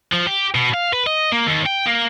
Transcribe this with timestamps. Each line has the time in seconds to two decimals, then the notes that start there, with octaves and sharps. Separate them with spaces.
0.13 F3
0.27 G4
0.55 B2
0.74 F5
0.93 B4
1.07 D#5
1.32 A#3
1.46 D#2
1.66 G5
1.86 A#3